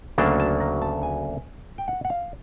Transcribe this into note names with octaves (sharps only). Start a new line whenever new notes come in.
D2 C#3 F#3 A#3 D4 A5
A5
A#5
A5
G#5
G5
F#5
F#5
F5